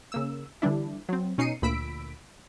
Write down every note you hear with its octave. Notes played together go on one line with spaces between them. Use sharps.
C#3 A#3 E6
D3 E3 G3 D4 E4
F#3 C4
B2 C#4 D#4 C7 C#7 D#7
D2 A#2 B5 E6 B6 D7